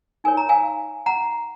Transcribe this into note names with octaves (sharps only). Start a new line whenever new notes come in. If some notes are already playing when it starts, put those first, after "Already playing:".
D#4 A#4 C#5 G#5
A#5
F5 G#5
F#5 A#5